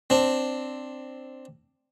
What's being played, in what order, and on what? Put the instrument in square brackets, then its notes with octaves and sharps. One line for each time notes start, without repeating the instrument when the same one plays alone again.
[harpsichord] C4 D4